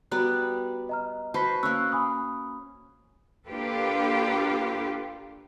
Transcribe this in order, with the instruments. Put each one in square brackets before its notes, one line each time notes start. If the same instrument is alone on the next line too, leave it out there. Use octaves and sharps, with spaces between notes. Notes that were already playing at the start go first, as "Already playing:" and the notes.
[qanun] G3 B3 D5 [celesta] F#4 A#5 F#6
[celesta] D#5 A#5 F6
[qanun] F#4 B4 C5 [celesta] A5 B5 B6
[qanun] A#3 C#4 [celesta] C#6 E6 F#6
[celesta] G#5 B5 D#6
[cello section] A#3 D4 F4 G4 A4 B4